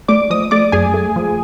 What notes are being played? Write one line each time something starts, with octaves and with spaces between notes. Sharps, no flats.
A3 D5 D6
F3 D#5 D#6
A3 D5 D6
F#2 G#4 G#5
A3
F3